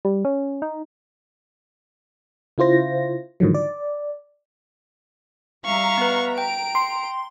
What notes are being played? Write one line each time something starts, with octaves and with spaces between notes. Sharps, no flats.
G3
C#4
D#4
C#3 E4 F4 C5 A#6
G#2 D3 D#3 F3 F#3
D5
G3 E5 F5 A#5 C#6
B3 B4
G5 A#5 D7
C6